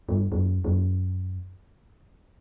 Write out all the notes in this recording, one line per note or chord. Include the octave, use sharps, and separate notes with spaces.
G2
F#2
F#2